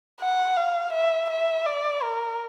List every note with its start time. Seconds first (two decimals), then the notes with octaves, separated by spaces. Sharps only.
0.21 F#5
0.57 F5
0.93 E5
1.30 E5
1.66 D5
2.03 A#4